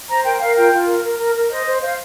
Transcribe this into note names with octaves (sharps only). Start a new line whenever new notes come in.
C5 A#5
A#4 G5
G5
A#4 F5
F4 G5
F4
A#4
A#4
A#4
A#4
C5 D#5
C5
C5 F5